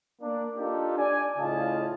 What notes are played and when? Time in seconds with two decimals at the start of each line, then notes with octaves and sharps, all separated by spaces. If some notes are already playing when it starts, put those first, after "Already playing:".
0.22 A#3 D4
0.57 D4 D#4 F4 G4 A4
0.97 D5 G#5
1.38 A2 C#3 F4 D#5 A5